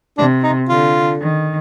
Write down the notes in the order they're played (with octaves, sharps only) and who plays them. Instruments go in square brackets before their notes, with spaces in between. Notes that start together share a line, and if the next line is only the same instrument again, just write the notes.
[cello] C3 [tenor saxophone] D4
[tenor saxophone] D#4
[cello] D3 [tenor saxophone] F4
[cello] D#3